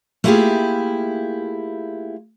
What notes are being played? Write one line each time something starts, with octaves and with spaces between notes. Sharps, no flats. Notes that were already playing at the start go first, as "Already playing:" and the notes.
A3 A#3 E4 F4 G4 G#4